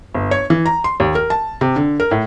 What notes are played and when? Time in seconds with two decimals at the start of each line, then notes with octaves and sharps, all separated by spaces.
0.14 G1
0.31 C#5
0.50 E3
0.66 A#5
0.84 C6
1.00 D#2
1.15 A#4
1.30 A5
1.61 C3
1.76 D3
2.00 A#4
2.11 A2